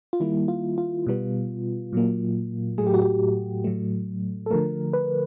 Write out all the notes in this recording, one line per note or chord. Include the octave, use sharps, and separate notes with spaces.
F4
D#3 G3 A#3 E4
F4
F4
B2 G3 B3
A#2 F#3 A#3
A2 F#3 A3 G#4
G4
F#4
G4
A2 F#3 A3
A4
D3 F3 A3 A#4
B4